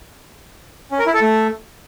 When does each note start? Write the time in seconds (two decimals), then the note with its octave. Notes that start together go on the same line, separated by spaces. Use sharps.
0.92 C#4
0.99 A#4
1.06 E4
1.14 A4
1.21 A3